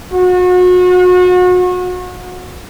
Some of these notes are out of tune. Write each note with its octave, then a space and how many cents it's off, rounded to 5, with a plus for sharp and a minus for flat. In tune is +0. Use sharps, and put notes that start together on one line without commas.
F#4 -35